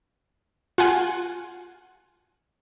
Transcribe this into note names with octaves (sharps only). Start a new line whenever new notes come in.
F4 F#5 G#5